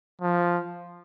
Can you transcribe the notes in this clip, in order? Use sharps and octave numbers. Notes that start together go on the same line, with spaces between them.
F3